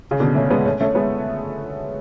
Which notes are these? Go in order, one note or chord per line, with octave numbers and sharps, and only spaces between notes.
C#3
B2 D3
A3 C#4
G#3 B3
A3 C#4
A3 C#4
G#3 B3